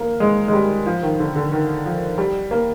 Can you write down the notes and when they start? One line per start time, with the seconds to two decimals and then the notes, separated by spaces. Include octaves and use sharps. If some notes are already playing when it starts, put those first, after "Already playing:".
Already playing: A#3
0.20 G#3
0.48 G#3
0.53 G3
0.86 F3
1.03 D#3
1.19 D3
1.36 D3
1.52 D#3
1.85 F3
2.18 G3
2.51 A#3